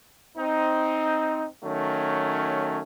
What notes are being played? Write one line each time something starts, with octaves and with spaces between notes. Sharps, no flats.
C4 D#4
D#3 F#3 A3 C#4